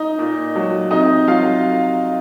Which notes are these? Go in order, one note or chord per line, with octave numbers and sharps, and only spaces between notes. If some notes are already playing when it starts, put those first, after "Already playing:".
Already playing: D#4 D#5
A#2
F#3
C3 D#4 D#5
F#3 F4 F5